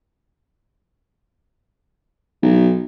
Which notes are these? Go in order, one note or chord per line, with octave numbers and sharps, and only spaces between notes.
B1